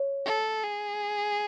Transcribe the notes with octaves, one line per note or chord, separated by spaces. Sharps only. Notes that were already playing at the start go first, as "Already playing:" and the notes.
Already playing: C#5
A4
G#4